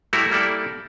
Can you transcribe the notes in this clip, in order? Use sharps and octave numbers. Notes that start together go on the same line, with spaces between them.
G3 A3 E4 F#4 A#4
G3 A#3 E4 A4 D5